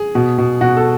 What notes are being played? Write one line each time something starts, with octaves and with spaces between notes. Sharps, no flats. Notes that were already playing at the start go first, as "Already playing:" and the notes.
Already playing: G#4
B2
B2
B2 F#4
A4